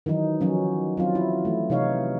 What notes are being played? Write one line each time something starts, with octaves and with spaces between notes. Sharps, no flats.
D#3 E3 F#3 D#4
F3 F#3 C#4
F#3 C4 F4
E4
E3 A3
C3 E3 D#4 C#5 F5